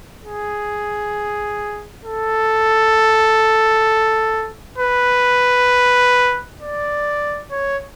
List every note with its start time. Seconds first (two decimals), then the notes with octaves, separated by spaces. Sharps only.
0.23 G#4
2.05 A4
4.78 B4
6.61 D5
7.51 C#5